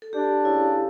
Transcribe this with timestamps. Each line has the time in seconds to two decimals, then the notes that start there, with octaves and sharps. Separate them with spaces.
0.02 A4
0.13 D4 G4
0.44 C#3 E4